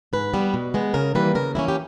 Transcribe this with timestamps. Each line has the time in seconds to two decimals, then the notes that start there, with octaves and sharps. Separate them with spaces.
0.13 G#2 B4
0.34 G3 B3
0.54 B2
0.74 G#3 B3
0.94 C#3 A#4
1.15 E3 G3 A#3 B4
1.35 C#3 A#4
1.55 E3 G3 A#3 C#4 E4
1.68 G4